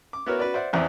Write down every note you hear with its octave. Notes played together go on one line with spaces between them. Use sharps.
D6
B3 E4 F#4 A#4 B4 C#5
F#4 B4 D5
C5 D5 E5 F#5
A1 E2 C4 E4 D5 G#5